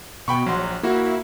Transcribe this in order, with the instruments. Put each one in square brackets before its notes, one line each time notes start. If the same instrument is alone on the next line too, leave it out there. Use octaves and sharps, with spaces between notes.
[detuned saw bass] B2 [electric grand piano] G5 B5 C#6
[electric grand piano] A#1 C6 [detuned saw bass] F#3
[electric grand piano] A#3 F#4 [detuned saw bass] E4